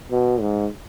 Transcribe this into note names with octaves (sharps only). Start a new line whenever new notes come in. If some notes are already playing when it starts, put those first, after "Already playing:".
B2
G#2